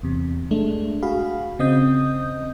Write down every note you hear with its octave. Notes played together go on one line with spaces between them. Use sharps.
E2 C3
G#3 A3 D4
F#4 G#4 F5 B5
C#3 C4 D#5 D#6 G6